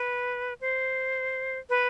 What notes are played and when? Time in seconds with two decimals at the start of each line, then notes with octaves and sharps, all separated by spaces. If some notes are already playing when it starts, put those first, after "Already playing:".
Already playing: B4
0.61 C5
1.69 B4